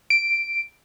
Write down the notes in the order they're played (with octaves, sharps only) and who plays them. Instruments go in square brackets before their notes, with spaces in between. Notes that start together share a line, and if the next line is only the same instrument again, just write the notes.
[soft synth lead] D7